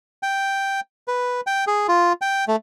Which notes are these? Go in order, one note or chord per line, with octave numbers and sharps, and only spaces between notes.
G5
B4
G5
G#4
F4
G5
A3